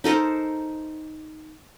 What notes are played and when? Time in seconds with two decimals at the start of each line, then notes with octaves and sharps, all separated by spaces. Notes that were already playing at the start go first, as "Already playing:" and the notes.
0.04 D#4 A4 A#4 C5